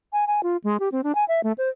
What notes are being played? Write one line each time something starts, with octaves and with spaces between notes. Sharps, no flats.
G#5
G#5
F4
G#3
G4
C4
D4
G#5
E5
A3
C5